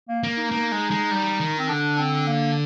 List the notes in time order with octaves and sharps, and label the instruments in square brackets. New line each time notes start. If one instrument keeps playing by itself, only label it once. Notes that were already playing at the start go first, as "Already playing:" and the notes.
[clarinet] A#3
[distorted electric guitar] A#3
[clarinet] D#4
[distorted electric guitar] A#3
G#3
G#3
G3
D#3
[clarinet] C4
[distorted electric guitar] D3 [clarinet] D4
[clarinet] C4
A#3